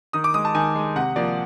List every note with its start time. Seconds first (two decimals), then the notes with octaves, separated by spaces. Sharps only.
0.13 D#3 D#6
0.24 D6
0.34 G#3 D#6
0.45 A5
0.55 D#3 G#5
0.75 G#3
0.96 C3 F#5
1.16 F3 A#3 D5